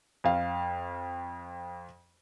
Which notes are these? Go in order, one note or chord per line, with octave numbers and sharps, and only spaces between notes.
F2 F5